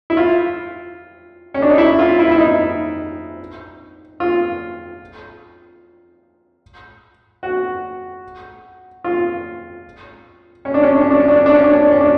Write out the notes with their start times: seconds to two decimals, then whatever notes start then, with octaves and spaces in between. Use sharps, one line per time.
0.10 E4
0.17 F4
1.54 C#4
1.62 D4
1.70 D#4
1.78 E4
1.99 F4
2.19 E4
2.31 E4
2.38 D#4
4.20 F4
7.43 F#4
9.04 F4
10.65 C#4
10.74 D4
10.83 C#4
10.92 D4
11.01 C#4
11.11 D4
11.20 C#4
11.28 D4
11.37 C#4
11.46 D4
11.56 C#4
11.64 D4
11.73 C#4
11.82 D4
11.91 C#4
12.01 D4